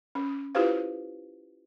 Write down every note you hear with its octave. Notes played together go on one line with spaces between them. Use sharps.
C#4
E4 F4 G4 B4 C5 F5